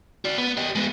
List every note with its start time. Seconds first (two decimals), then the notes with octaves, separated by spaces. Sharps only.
0.25 F#4 D5
0.38 B3
0.57 G4 D#5
0.75 G#3 B3